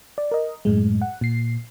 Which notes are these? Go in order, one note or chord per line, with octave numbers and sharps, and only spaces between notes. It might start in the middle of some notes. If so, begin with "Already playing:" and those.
D5
A#4 D#5
F#2 A2 G#3
F#5
A#2 C7